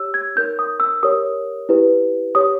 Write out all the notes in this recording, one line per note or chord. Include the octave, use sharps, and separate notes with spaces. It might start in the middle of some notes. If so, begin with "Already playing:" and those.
Already playing: G4 C#5 E6
G#6
D#4 A#4 C#5 G6
D#6
E6
G4 A#4 C#5 D#6
E4 G4 B4
G4 C#5 D#6